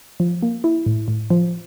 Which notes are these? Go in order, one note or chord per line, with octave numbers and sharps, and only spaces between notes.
F3
A#3
E4
A2
A2
F3